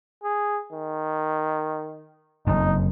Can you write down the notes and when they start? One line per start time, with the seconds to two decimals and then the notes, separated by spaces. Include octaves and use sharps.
0.24 G#4
0.73 D#3
2.47 F#1 F2 D#4